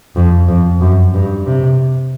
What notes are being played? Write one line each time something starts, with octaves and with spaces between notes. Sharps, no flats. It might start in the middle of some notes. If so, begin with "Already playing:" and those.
F2
F2
F#2
G2
C3